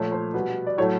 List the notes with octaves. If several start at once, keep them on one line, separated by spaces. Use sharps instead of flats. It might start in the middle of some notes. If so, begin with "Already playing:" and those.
Already playing: A#2 F3 A3 C#5
C5
B2 G3 B4
D5
A2 F#3 A3 C#5